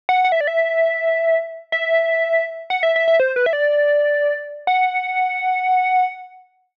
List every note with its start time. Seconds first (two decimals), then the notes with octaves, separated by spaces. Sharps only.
0.09 F#5
0.25 F#5
0.32 E5
0.41 D5
0.47 E5
1.72 E5
2.70 F#5
2.83 E5
2.96 E5
3.08 E5
3.20 C5
3.36 B4
3.46 E5
3.53 D5
4.67 F#5